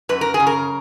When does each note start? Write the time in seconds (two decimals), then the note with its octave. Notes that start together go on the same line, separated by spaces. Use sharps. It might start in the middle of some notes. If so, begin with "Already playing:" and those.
0.09 F#2 B4
0.21 A#4
0.34 G#4
0.40 C#3
0.47 A#4